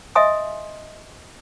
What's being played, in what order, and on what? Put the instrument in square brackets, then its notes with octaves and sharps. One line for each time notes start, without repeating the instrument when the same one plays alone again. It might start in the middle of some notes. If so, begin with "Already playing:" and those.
[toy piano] D#5 E5 G#5 C6 D#6